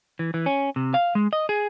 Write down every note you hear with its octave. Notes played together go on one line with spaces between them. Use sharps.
E3
E3
C#4
C3
F5
G#3
D#5
G#4